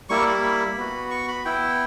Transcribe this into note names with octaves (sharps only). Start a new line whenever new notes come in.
G3 A#3 E4 C#6
B5
B5
B3 F#4
C#6
B5
B3 E4 G5